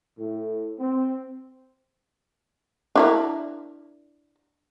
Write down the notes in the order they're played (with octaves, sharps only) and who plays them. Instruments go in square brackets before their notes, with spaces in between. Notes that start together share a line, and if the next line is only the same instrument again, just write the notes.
[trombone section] A2
C4
[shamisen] D4 E4 A#4